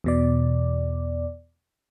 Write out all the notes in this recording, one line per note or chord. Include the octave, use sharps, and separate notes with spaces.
E2 B2 D5